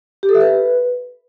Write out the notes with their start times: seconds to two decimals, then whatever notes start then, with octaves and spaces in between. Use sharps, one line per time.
0.23 G4
0.29 A4
0.35 E5
0.41 B4